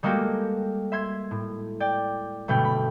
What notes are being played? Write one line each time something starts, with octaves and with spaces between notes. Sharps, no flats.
G3 G#3 A#3 F#4 G4 A4
E5 C6 G#6
A2
D5 G5
G1 B2 A3 G5
B5